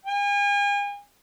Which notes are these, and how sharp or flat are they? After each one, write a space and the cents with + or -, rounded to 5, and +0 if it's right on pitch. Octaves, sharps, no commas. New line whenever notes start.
G#5 -40